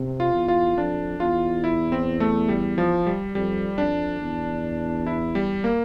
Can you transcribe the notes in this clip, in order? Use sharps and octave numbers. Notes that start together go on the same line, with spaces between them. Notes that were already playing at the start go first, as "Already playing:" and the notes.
Already playing: C3
F4
E2
F4
F2 D4
E2 F4
E4
C4
A3
G3
F3
G3
F2 G3
F2 D4
E2
E4
G3
A#3